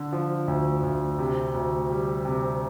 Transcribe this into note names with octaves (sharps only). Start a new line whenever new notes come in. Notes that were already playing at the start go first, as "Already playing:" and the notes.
Already playing: D3
F3
D2
D2
C3
D2
G3
C3